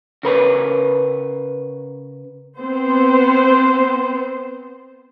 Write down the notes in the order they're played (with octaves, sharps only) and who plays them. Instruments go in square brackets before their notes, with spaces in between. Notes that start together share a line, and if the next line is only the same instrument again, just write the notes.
[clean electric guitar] C#3 A#4 B4 C#5
[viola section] B3 C4 C5